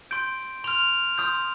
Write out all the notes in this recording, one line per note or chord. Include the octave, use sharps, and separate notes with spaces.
C6 G6 D7
C6 F6 F7
C6 D#6 G6